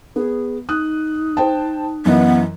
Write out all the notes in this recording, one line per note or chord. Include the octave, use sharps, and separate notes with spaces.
B3 G#4
D#4 D#6 F#6
C5 G5 A5
F#2 E3 B3 D#5